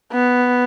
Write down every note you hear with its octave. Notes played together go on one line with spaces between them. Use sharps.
B3